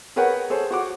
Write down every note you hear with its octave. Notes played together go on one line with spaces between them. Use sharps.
G#4 A#4 B4 C#5 F#5 G5
G#4 A4 C5 C#5
F#4 F#5 D6